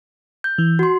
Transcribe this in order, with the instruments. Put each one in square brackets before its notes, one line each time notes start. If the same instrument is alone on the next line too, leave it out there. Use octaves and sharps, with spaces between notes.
[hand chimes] G6
[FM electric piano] E3
[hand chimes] F#4 C6